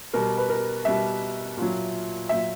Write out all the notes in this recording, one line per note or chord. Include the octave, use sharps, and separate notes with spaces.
B2 G3 A#4
B4
A#4
B2 G3 E5
A#2 F#3
A#2 F#3 E5